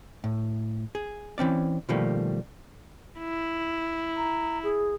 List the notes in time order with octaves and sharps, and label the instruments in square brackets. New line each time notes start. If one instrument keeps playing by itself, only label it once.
[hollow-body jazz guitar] A2
G#4
E3 C4 C#4 D5
B2 D#3 F3 G3 A3 A#3
[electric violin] E4
[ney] A#5
G#4